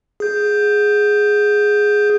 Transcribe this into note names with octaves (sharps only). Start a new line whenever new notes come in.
G#4 G6